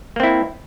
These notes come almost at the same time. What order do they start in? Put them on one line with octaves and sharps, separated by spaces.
A#3 C4 E4